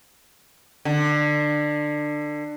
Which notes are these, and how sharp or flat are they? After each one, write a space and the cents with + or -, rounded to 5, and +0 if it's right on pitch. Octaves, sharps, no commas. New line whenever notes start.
D3 +20